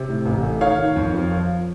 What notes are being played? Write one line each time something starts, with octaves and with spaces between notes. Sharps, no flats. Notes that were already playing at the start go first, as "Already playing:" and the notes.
Already playing: C3
A2
A1
A3
D#3 C#5 F5
D#3
F2
F3
F3